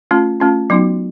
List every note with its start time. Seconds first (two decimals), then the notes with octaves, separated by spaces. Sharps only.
0.11 A3 C#4 F4
0.40 A3 C#4 F4
0.70 F#3 B3 D#4 F#4